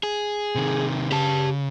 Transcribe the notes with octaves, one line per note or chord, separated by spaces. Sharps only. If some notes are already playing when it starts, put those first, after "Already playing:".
G#4
C3 D#3
C#3 G4 A5